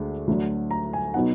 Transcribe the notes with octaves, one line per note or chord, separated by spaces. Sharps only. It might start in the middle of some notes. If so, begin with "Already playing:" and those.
Already playing: D2 D3 G#3 D4
D2 D3 F#3
A#5
G#5
B2 F#3 B3 D#4 F#5